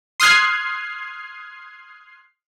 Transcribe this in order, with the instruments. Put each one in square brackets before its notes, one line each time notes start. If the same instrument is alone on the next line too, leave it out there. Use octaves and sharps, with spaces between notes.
[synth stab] C6 D#6 F6 F#6 G#6 C7